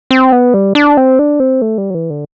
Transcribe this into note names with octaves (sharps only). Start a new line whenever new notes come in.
C4
B3
G3
D4
C4
D4
C4
A3
G3
F#3
E3
D3